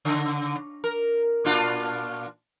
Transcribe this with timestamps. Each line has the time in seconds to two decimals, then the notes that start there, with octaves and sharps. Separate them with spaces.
0.05 C#3
0.84 A#4
1.45 A#2 D4 F4